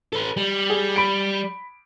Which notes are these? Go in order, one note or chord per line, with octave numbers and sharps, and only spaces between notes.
A4 B4
G3
G#4
B5 D7